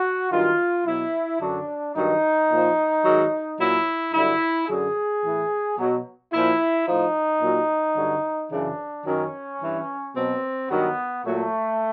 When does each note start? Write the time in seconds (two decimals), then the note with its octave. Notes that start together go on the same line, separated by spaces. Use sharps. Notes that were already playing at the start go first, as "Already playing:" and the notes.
Already playing: F#4
0.32 G2 D#3 F#3 F4
0.86 B2 F#3 E4
1.41 F#2 D3 F#3 D4
1.96 G2 D#3 F#3 D#4
2.50 A#2 F3
3.05 G#2 D#3 F#3
3.59 A#2 F#3 E4
4.14 G2 D3 F#3 E4
4.68 F#2 D3 F#3 G#4
5.24 A2 E3
5.78 B2 F#3
6.33 A#2 F3 E4
6.87 A2 F3 D#4
7.41 A#2 F#3
7.97 G2 D3 F#3
8.51 F#2 C#3 E3 D4
9.06 F#2 D#3 F#3 C#4
9.61 G2 E3
10.15 B2 F#3 C4
10.70 G2 D#3 F#3 B3
11.24 A#2 F#3 A3